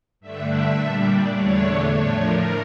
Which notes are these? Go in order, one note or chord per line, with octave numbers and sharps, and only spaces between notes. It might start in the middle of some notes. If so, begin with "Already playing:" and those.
G2 D3 A3 D4 E5
E5
A#2 G3 D4
D5
E2 D3 A3 D4 C#5
A2 F3 A3 D4 C#5
A#4